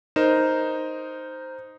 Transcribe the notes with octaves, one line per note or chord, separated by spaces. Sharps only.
D#4 A#4 C5 E7